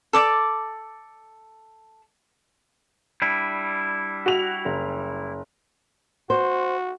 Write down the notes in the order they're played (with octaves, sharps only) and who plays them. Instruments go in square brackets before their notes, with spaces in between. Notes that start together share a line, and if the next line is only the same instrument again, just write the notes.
[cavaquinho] A4 D5 D6
[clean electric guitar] G3 D4 E4
[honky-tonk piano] F#4 F7
F#1
[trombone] F#4 [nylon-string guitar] C5